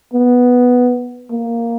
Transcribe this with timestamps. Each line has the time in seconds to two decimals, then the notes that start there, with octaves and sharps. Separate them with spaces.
0.13 B3
1.31 A#3